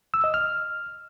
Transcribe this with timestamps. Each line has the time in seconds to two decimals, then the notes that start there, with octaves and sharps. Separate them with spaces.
0.14 E6
0.24 D#5
0.34 F6